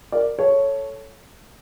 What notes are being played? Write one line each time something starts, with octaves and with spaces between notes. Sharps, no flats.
A#4 D5
A4 C#5